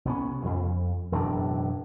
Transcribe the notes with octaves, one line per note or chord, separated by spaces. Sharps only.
C2 B3 C#4
F2
E1 F#2 A2 D4